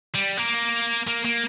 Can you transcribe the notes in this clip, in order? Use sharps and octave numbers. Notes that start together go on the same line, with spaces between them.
G3
A#3
A#3
A#3